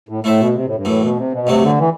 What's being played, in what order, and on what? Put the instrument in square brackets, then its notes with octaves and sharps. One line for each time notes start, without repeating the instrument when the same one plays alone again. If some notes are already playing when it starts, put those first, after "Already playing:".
[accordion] A2
[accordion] A2 [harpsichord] A3 E4 A4 C5 E5
[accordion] B2
C3
A2
G2
[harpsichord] F#2 E3 A3 [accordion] A2
[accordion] B2
C3
B2
[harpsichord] G2 F#3 A3 C4 G4 [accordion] C3
[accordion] D3
E3